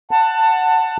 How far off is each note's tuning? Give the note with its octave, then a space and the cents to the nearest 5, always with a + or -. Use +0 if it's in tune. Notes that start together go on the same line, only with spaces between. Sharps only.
F#5 +0 A5 +20